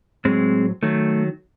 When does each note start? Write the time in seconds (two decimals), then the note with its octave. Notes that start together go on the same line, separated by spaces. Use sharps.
0.25 A2 F#3 G#3 C4
0.83 D#3 F#3 A3